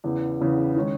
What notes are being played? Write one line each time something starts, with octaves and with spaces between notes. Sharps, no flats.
E2 C#3 E3 B3
E2 C#3 E3 B3
D#3 G#3 C#4